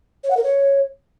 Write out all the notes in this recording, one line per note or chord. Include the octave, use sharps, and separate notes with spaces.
C#5
F#5
A#4
C#5